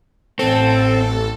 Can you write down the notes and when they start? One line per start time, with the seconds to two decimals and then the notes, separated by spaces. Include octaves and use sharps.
0.39 A1 C4 A4